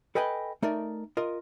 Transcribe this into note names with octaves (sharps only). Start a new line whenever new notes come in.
A4 B4 D#5 G5 G#5 B5
A3 D#4 A#4 D5
F4 A#4 D#5